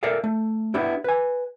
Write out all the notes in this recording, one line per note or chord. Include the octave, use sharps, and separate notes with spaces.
A4 A#4 D5 E5 F5
A3
B3 D4 E4 G4
B4 G#5